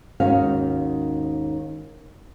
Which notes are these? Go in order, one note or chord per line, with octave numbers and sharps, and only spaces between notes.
D#2 G#2 D#3 C#4 F#4 F5